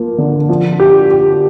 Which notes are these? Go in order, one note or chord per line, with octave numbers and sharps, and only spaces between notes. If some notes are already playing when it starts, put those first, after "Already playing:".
Already playing: F3 A#3
D3
F3
G4
G4